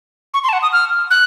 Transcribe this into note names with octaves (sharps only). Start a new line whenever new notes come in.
C#6
C6
A5
F#5
D#6
F6
F#6